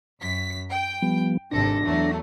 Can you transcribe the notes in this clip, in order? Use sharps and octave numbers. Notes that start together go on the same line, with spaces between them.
F#2 B6
G5
F3 G3 B3
G#1 C3 D4 A4 A#6
E2 F#3 A3